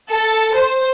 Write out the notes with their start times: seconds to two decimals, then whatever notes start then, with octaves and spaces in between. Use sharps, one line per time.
0.11 A4
0.55 C5